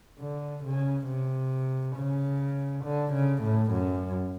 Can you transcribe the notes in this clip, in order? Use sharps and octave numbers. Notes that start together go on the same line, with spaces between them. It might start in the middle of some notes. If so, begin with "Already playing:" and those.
D3
C#3
C3
C#3
D3
C#3
A2
F#2